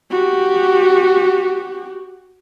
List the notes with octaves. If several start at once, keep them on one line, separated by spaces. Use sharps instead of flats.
F#4 G4